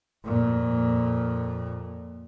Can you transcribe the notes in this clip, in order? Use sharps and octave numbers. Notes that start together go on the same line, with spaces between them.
F2 A#2